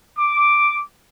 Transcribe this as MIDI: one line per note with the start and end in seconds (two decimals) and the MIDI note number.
0.17 0.80 86